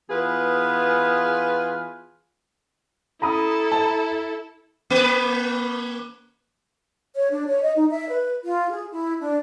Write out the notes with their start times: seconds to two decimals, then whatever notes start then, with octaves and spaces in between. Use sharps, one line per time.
0.10 E3 B3 F4 G#4 B4
3.22 E4 A4 A#5 B5 D#6
3.72 A5
4.90 A#3 B4
7.15 C#5
7.30 D4
7.47 C#5
7.62 D#5
7.76 D#4
7.91 E5
8.09 B4
8.44 F4
8.70 G#4
8.91 E4
9.20 D4